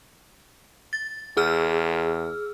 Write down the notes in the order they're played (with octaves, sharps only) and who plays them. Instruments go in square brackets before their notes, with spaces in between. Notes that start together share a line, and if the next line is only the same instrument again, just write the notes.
[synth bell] A6
[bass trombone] E2 [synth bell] G#4 E6 F6